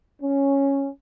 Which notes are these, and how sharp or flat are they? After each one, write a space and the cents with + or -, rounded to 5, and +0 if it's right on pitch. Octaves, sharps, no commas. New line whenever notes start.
C#4 -5